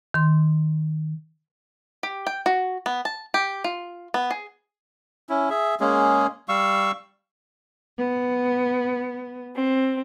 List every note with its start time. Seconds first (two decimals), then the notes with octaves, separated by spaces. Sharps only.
0.14 D#3 C6
2.03 G4
2.27 G5
2.46 F#4
2.86 B3
3.05 A5
3.34 G4
3.64 F4
4.14 B3
4.31 G#4
5.29 C#4 E4
5.50 G#4 E5
5.80 G#3 A#3 C#4 G#4
6.49 G3 F5 C#6 E6
7.98 B3
9.55 C4